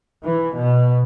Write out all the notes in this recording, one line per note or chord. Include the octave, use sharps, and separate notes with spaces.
E3
B2